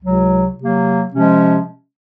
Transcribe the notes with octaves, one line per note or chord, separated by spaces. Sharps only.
C#2 C3 F#3
C3 F#3 A#3
C3 F3 G#3 C#4